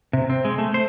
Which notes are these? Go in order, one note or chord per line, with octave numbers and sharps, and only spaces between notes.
C3
C4
G#3
A3
C5